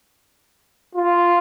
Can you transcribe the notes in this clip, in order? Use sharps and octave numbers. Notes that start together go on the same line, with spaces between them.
F4